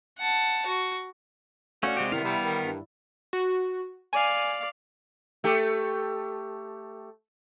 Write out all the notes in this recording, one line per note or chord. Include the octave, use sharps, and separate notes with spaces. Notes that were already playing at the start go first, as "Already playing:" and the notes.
F#5 A5
F#4
A3 C#4 F#4 D5 F5
C3 G#3 C4 G4
D#3 B3 E4 F5
C3 G3
D#3
G2
F#4
D5 F5 G#5
A3 G4